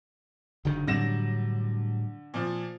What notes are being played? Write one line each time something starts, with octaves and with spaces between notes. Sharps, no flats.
F#1 D3 D#3
A2 D3 F#3 G3 A#6 E7
A#2 F3